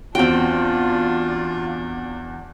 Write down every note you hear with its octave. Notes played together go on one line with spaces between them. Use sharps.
E2 C4 D4 F4 F#4 G5